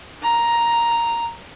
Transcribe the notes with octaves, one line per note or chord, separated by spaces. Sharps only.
A#5